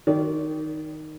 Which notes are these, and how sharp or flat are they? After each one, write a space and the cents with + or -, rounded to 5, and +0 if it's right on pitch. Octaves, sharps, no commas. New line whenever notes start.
D#3 +0 D5 -30